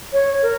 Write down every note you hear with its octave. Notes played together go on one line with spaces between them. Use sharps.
C#5
A#4